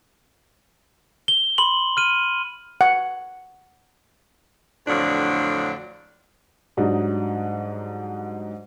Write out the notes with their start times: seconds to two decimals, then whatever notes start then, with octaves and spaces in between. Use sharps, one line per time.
1.28 G7
1.58 B5 C6 F#7
1.97 F6 D#7
2.81 F#5
4.87 F2 A2 D3 F3 F#3 D4
6.77 G#2 F#3 G3 D4 D#4